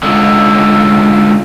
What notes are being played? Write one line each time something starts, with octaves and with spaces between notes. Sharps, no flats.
C#2 D3